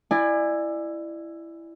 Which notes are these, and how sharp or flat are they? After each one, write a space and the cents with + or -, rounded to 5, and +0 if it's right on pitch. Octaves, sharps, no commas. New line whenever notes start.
E4 +10 D5 +30 G#5 -10